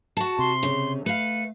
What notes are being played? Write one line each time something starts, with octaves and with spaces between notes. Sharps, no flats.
F#4 A5
C3 C6
C#3
A3 B4 F5 C#7